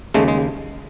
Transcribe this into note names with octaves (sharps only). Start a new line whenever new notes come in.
D#2 C#3 G#3 A3
G#3